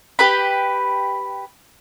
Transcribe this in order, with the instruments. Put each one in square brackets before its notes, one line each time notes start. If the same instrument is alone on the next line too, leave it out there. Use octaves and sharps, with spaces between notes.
[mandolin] G4 B4 B5